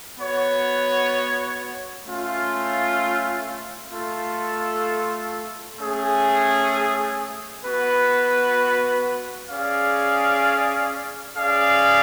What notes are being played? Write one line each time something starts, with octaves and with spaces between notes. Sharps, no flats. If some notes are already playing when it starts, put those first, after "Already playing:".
B3 F#4 C#5
A3 C#4 F4
A3 F4 A4
A3 C#4 G#4
B3 F#4 B4
C#4 G#4 D5 F5
C#4 G#4 D5 F5